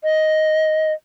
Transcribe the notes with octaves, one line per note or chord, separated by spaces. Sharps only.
D#5